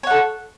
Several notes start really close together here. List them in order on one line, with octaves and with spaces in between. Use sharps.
C#5 F#5 A4